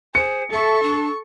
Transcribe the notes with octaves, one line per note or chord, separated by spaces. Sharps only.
G#4 C5 C#7
A4 E5 C#6
D4